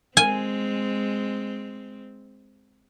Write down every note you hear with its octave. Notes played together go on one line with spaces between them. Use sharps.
G#3 C4 G#5